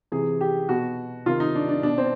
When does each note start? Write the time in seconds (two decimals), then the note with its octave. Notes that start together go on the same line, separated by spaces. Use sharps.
0.12 C3 E3 G#4
0.41 G4
0.69 B2 F#4
1.26 C3 D#3 F4
1.40 D#4
1.55 D4
1.69 D4
1.83 B2 D4
1.98 C4